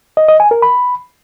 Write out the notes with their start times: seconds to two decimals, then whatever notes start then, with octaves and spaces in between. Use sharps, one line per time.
0.17 D#5
0.28 D#5
0.40 G#5
0.51 A#4
0.62 B5